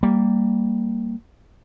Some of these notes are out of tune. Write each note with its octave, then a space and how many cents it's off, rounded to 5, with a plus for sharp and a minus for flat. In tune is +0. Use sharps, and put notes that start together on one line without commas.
G3 +0 A#3 -10